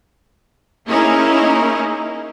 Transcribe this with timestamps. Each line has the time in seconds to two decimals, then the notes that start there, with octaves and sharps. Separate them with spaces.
0.87 A#3 C#4 D#4 E4 G#4 A#4